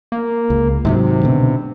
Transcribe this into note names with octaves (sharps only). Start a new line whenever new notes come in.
A#3
C#2
G#2 C3 D#3 F#3
B2 D3